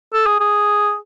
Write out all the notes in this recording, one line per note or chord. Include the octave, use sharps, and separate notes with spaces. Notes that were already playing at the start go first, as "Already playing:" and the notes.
A4
G#4
G#4